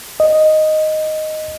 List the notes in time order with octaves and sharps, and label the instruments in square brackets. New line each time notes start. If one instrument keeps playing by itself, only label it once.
[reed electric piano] D#5